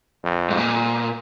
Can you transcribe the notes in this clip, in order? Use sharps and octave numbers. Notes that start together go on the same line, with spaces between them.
F2
G#2
A#2